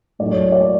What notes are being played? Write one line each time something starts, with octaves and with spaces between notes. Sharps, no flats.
A2 F#3 A3 D5
C#5
C#5
D5